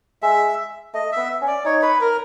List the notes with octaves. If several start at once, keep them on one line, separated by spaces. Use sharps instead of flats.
G#3 E5
A3 D#5
B3 E5
C#4
D5
D#4 C#5
B4
A#4